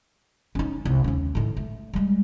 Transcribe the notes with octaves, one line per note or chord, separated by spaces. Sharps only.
C#4 D#4
C2
D#2 C#4
A2 D#3
A3
G3 G#3